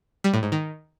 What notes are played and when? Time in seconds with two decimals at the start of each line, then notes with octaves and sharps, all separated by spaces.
0.24 G3
0.34 A2
0.43 G#2
0.52 D#3